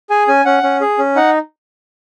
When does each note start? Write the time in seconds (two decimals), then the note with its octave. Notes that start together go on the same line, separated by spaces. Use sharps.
0.10 G#4 G#5
0.28 C#4 G#5
0.45 C#4 F#5
0.63 C#4
0.81 G#4
0.98 C#4
1.16 D#4 F#5